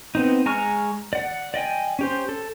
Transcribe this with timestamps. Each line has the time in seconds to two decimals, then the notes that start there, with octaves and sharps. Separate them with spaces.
0.15 B3 C4 D#4
0.46 G#3 G#5 A#5 C#6 F6
1.13 D5 F#5
1.54 D5 D#5 G5 G#5
1.99 C#4 G4 C5
2.29 A4